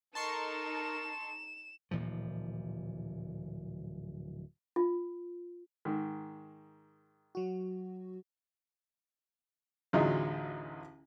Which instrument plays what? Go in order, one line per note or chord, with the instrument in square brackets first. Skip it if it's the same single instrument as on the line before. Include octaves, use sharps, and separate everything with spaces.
[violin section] D#4 A4 [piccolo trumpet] A#4 [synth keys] A5 C6 C#6 [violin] E7
[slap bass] D1 A#2 E3 F3
[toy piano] F4
[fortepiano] G#2 D#3
[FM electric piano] F#3 F#4
[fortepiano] A1 D2 F#3 D#4 F4 G#4